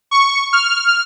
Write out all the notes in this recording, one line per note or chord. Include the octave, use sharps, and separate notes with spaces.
C#6
F6